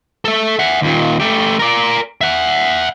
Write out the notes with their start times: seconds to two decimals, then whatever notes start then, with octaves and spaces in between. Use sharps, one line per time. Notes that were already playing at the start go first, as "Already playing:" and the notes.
0.25 A4 E5
0.59 E5 F#5
0.82 D#2 A#2
1.20 A3 G4
1.59 A#4 D5
2.21 E5 F#5